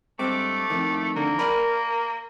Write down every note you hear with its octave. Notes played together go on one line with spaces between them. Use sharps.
G2 G#3 A3 C4 D6
F2 A2 D#3
D3 A#3
A#4 D5 G#5 B5